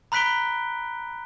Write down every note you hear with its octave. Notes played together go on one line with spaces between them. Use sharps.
A#5 B5 F#6 B6 D7 G7